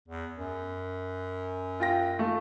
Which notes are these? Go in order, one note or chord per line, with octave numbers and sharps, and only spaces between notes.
E2
F#2
F4 G5 A#6
A3 F4